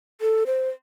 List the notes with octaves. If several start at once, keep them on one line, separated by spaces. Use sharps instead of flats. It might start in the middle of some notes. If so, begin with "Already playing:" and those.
A4
C5